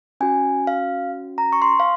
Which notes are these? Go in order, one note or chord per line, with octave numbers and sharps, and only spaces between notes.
C#4 F#4 G#5
F5
A#5
C#6
C6
F5